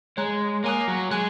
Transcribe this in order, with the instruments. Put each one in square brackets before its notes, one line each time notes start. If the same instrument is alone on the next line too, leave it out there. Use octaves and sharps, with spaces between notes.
[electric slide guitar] G#3 [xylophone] C#5 A#5 F#6
[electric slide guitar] A#3 [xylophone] C#5 G#5 D#6 F#6
[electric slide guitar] F#3
[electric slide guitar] G#3 [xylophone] G#5 F#6